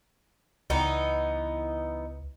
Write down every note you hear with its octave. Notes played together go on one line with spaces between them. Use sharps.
C#2 E3 B3 D#4